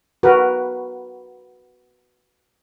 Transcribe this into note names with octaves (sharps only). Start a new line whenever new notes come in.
F#4 A#4 B4